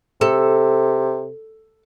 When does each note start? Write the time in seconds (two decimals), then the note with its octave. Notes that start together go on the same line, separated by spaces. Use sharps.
0.21 C3 A4